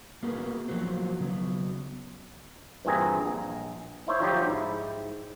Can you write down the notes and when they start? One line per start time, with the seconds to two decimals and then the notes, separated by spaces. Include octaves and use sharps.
0.23 A#3 B3 F#4 G#4 A#4 B4
0.68 F3 F#3 A#3 F#4 C5
1.20 C#3 F#3 B3
2.85 G2 A#2 E3 C4 G#4 A#5
3.26 A#1
4.07 D#4 E4 C5 C#5 E5
4.20 D3 F3 F#3 D#4 G4
4.47 G#2 E4